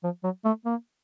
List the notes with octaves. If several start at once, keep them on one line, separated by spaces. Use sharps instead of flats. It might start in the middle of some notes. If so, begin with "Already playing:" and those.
F3
F#3
A3
A#3